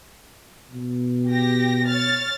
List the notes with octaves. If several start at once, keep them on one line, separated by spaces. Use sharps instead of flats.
B2
G4 A#6
C#5 F6 A6